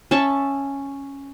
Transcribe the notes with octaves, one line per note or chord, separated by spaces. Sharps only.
C#4 E5 A5 C#6